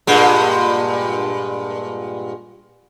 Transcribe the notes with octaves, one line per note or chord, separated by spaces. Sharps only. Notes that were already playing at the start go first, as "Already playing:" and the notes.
G2 A#2 G#3